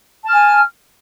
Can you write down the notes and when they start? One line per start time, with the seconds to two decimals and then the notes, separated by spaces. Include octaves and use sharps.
0.24 A5
0.28 F6
0.32 G#5